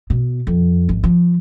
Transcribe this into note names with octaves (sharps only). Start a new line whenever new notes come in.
B2
F2
G#1
F3